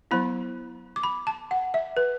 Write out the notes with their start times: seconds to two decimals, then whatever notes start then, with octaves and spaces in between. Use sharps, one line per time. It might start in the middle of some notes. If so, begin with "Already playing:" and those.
0.11 F#3 B3 E4 B5
0.96 D6
1.03 B5
1.27 A5
1.51 F#5
1.74 E5
1.97 B4